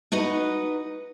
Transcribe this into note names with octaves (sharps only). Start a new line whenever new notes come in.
D#4 F#4 B4 D#5